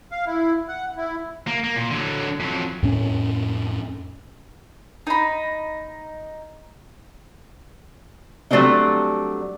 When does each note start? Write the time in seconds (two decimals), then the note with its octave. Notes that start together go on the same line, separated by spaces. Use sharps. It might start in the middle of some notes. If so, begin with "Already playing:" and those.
0.12 F5
0.27 E4
0.68 F#5
0.97 E4
1.47 A#3
1.64 A#3
1.76 A#2
1.91 D3 F#3
2.40 F2 F#3
2.83 F2 A2 C#4
5.07 D#4 B5
8.51 F#3 G3 A3 C4 D4 D#4